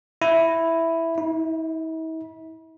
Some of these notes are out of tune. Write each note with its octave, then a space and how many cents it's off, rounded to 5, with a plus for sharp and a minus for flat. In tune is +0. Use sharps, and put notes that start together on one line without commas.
E4 +0
E4 -45